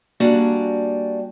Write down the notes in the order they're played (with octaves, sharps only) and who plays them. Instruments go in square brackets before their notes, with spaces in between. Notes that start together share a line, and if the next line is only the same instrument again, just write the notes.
[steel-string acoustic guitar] G3 A#3 D4 F#4 D5 G#5